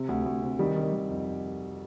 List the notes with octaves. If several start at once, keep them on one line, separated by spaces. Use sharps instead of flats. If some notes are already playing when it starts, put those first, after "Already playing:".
Already playing: C3
D2
D2
C3
D#3 G3
D#3 G3
D#3
F2